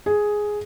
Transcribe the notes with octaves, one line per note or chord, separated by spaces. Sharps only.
G#4